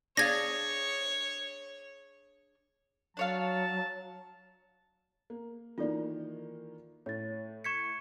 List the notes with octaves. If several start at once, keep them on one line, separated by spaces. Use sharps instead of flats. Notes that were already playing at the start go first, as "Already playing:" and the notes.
D4 G#4 C#5 F5 G#6 A#6
F#3 D4 C#5 F5 A5
A#3
D#3 E3 A#3 F4 A4 D5
A2 C#5 A6
C#6 G#6 B6 C#7 E7